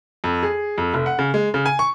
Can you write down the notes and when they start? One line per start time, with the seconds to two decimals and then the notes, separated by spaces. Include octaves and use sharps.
0.24 F2
0.43 G#4
0.78 F2
0.94 F1
1.06 F#5
1.19 C#3
1.34 G#3
1.54 C#3
1.66 G#5
1.79 C#6